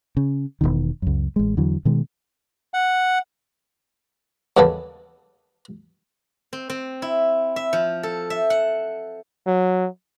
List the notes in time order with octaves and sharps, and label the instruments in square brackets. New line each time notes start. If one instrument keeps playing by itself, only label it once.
[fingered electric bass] C#3
E1 B1 B2 D#3
C#2 F#2
A1 G#3
E2 D3 E3 F#3
B2 D#3 G#3
[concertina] F#5
[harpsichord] D#2 C#3 G3 B3 A4
[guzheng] C4
C4
E4
E5
F3
A4
E5
F#5
[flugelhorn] F#3